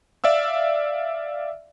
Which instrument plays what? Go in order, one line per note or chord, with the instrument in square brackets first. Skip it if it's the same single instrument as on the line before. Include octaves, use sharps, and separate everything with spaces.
[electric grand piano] D5 E5 F5 E6